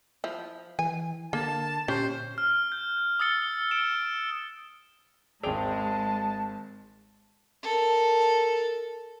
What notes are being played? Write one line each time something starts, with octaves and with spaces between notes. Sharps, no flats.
F3 E4
E3 G#5
D3 A#3 A5
A#2 C#4 G4 C5
F6
G6
D#6 E6 A6 C#7 G7
D7 E7
G#1 G#3 G#4 D5 G5 A5 F7
A4 A#4